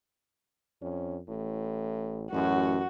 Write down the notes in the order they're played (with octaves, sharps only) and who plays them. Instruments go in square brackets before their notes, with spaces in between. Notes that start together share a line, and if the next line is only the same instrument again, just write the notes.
[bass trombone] F2 [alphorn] C#4
[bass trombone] A1 [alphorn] A2
[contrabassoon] A1 [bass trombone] F#2 [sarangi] F#4